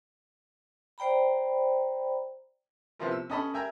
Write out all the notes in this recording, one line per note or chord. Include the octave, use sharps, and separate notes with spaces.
C5 D5 G5 A#5 B5
C3 F3 B3 E4 F4 A#4
E6
C#4 A4 D#5 A5 B5
A#4 E5 G5 G#5 A#5